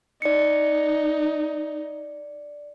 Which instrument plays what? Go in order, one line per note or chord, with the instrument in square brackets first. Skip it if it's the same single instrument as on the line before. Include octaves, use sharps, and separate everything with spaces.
[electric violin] D#4 [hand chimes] D5 C#7